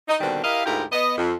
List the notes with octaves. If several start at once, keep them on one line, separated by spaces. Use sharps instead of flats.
D#4
B2 D3 D#3 G3 B3 C4
E4 G4 A#4 D#5 F5
D2 G#2 E4 F4 G4 A#4
B3 D#5
F2